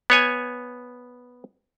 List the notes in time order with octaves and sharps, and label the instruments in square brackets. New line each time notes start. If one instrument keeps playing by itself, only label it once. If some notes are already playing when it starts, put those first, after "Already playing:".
[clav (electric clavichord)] B3 C#5 G#5